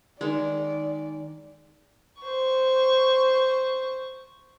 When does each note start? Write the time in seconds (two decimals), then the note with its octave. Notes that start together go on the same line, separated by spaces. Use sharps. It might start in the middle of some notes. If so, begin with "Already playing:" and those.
0.21 D#3 G#3 D5
2.20 C5 C#6